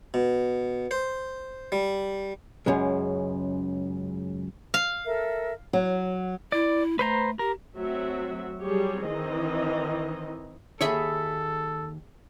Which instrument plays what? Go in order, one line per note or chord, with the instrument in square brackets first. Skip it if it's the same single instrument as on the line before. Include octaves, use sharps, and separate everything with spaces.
[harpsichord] B2
C5
G3
[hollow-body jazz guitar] C#2 F#2 C#3 G#3
[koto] F5
[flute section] A4 A#4 E5
[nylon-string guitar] F#3
[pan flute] E4 [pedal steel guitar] D5
[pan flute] A3 [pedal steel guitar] B4 C5 A#5
[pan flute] G4 [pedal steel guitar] A#4
[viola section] F#3 A3 C4 F#4 E5
F#3 G3 G4 G#4 C#5
D#3 E3 C4 D#5
[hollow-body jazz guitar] D#2 C#5 [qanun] G#4 E5 B5 [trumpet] A4